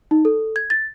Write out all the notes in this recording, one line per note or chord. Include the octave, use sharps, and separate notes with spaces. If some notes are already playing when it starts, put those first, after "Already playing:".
D#4
A4
G#6
A6